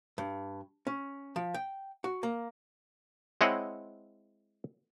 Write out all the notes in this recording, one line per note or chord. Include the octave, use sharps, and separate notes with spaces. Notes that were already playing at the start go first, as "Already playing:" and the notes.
G2
C#4
F3
G5
F#4
A#3
G#3 C4 E4 C#5 D#5 F#5